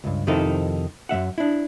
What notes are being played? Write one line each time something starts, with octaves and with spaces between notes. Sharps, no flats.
C#2 G2
F2 C3 D#3 D#4 E4 A4
F#2 F3 E5 F#5
D4 E4